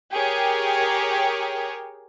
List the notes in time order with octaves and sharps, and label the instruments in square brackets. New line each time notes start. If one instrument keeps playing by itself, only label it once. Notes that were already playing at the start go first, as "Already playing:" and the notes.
[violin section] G4 G#4 A#4 C#5